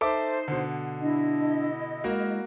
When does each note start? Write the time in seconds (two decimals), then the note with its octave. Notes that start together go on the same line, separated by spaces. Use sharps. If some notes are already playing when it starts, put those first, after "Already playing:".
0.01 D#4 A4 C5 E5 D6
0.48 B2 D3
1.01 D4 E4 D#5
2.04 G#3 A#3 F#4 A#4